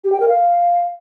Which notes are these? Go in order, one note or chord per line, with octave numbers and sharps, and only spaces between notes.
G4
G5
A#4
F5